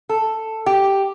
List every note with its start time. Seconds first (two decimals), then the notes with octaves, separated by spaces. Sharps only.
0.09 A4
0.66 G4